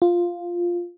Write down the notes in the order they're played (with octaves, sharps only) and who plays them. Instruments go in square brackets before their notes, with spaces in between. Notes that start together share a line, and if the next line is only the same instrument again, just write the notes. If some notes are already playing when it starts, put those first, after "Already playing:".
[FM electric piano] F4